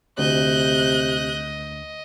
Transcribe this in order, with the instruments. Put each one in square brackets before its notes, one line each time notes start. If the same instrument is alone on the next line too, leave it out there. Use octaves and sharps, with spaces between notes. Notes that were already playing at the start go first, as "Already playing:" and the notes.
[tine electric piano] D2 [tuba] C3 [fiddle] D#5 [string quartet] F#6 G6